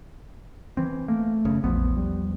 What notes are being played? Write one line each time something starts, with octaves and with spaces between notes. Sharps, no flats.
E3 C4
A3 A#3
F#1 C#3
A#1 E2 F3 B3
G3